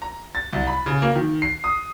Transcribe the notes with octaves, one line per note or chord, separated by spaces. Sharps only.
A#5
A6
C2
B5
C#3
A#3
D#3
C7
D#6